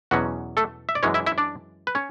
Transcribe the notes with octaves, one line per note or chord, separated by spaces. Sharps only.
E2 B2 F#3 C#4 F#4
A3 A4
E5
D5
F#2 E3 G#3 C#4 C#5
E4 E5
E4 E5
D4 D5
B4
C#4 C#5